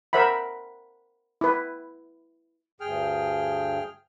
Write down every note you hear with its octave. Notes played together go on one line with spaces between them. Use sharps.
A#4 C5 E5 F#5 B5
E4 B4
D2 G2 G#4 G5 F6